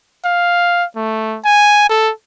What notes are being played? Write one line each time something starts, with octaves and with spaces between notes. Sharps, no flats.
F5
A3
G#5
A4